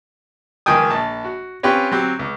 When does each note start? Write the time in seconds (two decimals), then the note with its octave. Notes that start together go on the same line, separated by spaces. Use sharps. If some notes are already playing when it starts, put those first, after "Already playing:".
0.66 C#2 D#3 F3 G5 G#5 D#6
0.90 A#1 A5
1.25 F#4
1.63 C4 C#4 F4 G4 B4 C#5
1.92 F#3 C4 G4
2.19 C#2